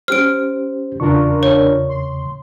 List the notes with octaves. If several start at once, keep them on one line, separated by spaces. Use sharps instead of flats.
C#4 G4 C5 F6 D7
E2 C#3 D4 F4 A#4 C#6
C#5
C6